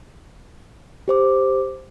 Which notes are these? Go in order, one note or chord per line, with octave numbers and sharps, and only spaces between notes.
G4 C5 D6